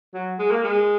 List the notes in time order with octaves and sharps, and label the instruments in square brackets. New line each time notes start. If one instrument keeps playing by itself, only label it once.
[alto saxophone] F#3
G#3
A#3
G#3